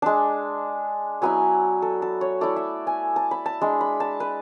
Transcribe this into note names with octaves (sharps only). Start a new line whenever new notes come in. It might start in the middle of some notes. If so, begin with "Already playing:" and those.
G#3 D4 A5
F#3 B3 E4 G#5
A4
A4
C#5
A3 E4 D5
E5
G#5
A5
B5
A5
G#3 D4
B5
A5
B4